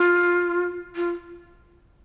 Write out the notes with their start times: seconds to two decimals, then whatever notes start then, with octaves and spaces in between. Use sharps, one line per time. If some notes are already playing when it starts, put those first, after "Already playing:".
Already playing: F4
0.96 F4